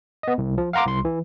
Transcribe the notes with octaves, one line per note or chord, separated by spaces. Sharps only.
B3 D#5
C2
F3
F5 F#5 A#5 C6 D6
C2 C6
E3